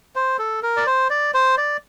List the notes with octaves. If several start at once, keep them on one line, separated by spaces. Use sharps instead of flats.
C5
A4
A#4
D5
C5
D5
C5
D5